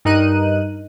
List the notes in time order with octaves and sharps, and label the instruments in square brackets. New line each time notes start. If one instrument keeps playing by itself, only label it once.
[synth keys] G2 D#4 A#4 F#6 D#7